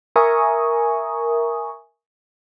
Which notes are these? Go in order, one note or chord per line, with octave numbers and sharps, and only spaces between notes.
A#4 E5 G#5 A#5 C#6 D#6